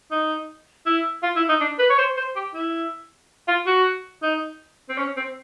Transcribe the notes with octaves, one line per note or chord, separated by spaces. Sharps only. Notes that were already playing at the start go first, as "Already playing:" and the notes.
D#4
E4
F4
E4
D#4
D4
B4
C#5
C5
C5
G4
E4
F4
F#4
D#4
C4
C#4
C4